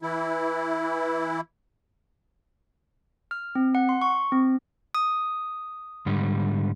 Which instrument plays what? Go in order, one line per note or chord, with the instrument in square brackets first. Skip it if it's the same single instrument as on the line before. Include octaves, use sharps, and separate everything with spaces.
[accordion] E3 E4
[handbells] F6
C4
F#5
C6
C#6
C4
D#6
[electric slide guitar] G#2 D3 G3